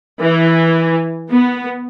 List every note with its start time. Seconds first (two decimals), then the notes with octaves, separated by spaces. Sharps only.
0.19 E3
1.30 B3